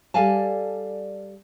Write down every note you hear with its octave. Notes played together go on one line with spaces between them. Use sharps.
G3 A4 D5 F5 G#5 A5